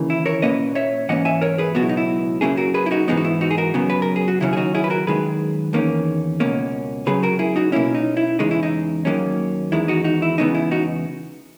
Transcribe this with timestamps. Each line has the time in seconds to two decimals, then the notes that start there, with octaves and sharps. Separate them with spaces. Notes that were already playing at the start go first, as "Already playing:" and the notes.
Already playing: D#2 C#3 E3 A#3
0.10 E4
0.26 A#4 C#5
0.42 A#2 A#3 C#4 B4 D#5
0.75 C#5 E5
1.09 G#2 E3 A#3 C#4 D#5 F#5
1.25 E5 G#5
1.41 A#4 C#5
1.58 G#4 B4
1.75 C#2 B2 F#3 B3 F#4
1.83 E4
1.89 D#4
1.97 E4
2.41 F#2 C#3 F#3 A#3 C#4 E4 G#4
2.57 F#4 A#4
2.74 G#4 B4
2.86 E4
2.91 D#4 F#4
3.08 G#2 E3 G#3 B3 D#4
3.17 F#4
3.24 E4
3.41 D#4 F#4
3.51 G#4
3.58 F#4 A#4
3.74 F#2 C#3 F#3 B3
3.90 B4
4.02 A#4
4.16 G#4
4.28 F#4
4.40 D#2 C#3 F#3 C#4 E4
4.53 G#4
4.57 D#4 F#4
4.75 E4 G#4
4.84 B4
4.90 F#4 A#4
5.07 F#2 D#3 G#3 G#4 B4
5.73 E2 D#3 A#3 C#4
6.40 C#2 B2 A#3 C#4
7.06 C#2 C#3 F#3 G#4 B4
7.23 F#4 A#4
7.39 E4 G#4
7.56 D#4 F#4
7.72 B2 A#3 C#4 E4
7.95 D#4
8.17 E4
8.39 E2 C#3 G#3 D#4
8.51 E4
8.63 D#4
9.05 D#2 D#3 F#3 A#3 C#4
9.72 E2 D#3 G#3 E4
9.88 D#4 F#4
10.04 D#4 F#4
10.22 E4
10.38 E2 C#3 G#3 B3 D#4
10.55 E4
10.71 D#4 F#4